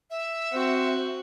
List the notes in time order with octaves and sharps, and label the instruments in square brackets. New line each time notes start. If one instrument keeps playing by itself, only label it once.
[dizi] E5
[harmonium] C4 C5 [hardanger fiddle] F#4